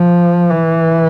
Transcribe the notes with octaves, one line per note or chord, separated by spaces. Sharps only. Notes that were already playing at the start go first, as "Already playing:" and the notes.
Already playing: F3
E3